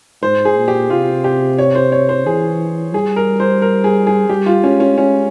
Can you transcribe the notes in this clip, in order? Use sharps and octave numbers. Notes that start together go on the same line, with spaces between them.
G#2 C5
G#4
A#2
G4
C3 F4
G4
C#5
C5
C#5
C5
E3 G#4
G3 G#4
A#4
C5
A#4
G#4
G#4
G3 G4
F4
G#3 C#4
C#4
C#4